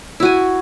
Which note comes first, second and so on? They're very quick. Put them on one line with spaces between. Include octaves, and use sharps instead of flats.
E4 F#4 G#5